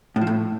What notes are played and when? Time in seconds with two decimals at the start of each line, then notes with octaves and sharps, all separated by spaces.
0.16 A2
0.21 F3
0.27 A2